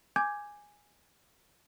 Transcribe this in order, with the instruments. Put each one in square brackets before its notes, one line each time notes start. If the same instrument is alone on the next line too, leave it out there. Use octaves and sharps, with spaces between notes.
[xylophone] G#5 D6 G6 G#6